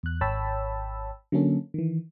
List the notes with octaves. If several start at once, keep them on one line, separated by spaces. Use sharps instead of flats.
E2 F#6
G#1 C#5 G5 A5 B5 E6
D3 F#3 A#3 C#4 A4
D#3 E3